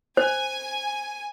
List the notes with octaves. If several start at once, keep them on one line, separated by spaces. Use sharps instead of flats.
C5 G#5